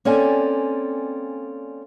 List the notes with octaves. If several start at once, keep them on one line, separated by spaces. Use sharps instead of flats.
A#3 C4 C#4 A4 D5 G#5